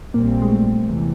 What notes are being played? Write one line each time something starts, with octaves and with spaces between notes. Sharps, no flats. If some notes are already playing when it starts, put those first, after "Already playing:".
A#1 A#2 G3 A#3 C4
G#3
A3
E2 C3 E3